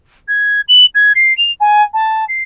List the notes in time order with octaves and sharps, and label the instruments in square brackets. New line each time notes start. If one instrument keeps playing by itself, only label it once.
[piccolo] G#6
F#7
G#6
C7
F7
G#5
A5
C7